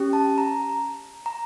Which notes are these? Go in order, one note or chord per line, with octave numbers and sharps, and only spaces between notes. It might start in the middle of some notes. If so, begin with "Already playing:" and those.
Already playing: C#4 G4
A5
A#5
A#5